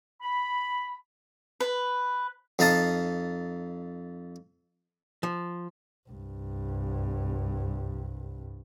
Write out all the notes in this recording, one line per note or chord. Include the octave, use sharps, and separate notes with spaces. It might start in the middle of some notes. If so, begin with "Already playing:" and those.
B5
B4
F2 D#4 F5 A5 D#6
F3
C2 G2